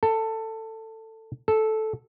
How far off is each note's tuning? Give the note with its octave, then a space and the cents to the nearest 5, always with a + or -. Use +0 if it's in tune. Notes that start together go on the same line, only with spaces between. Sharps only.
A4 +15
A4 -10